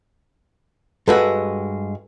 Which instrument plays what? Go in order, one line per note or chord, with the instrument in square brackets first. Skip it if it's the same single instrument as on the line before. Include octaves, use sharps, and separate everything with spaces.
[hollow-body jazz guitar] G2 G#3 F#4 [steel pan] A4 B4